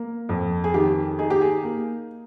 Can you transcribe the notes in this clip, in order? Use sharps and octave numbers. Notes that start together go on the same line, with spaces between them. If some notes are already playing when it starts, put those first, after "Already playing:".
Already playing: A#3
F2
G#4
D#3 G4
D#4 G#4
G4
G#4
A#3